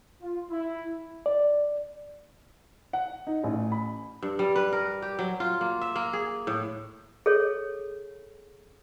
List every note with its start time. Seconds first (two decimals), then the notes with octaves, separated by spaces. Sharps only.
0.23 F4
0.51 E4
1.26 D5
2.93 F#5
3.27 D#4
3.44 A1
3.72 B5
4.23 G2
4.39 G3
4.56 B4
4.73 A#4
5.02 G4
5.19 F#3
5.40 F4
5.61 A#3
5.81 E5
5.96 A#3
6.13 G#4
6.47 A2
7.26 G#4 A4 C#5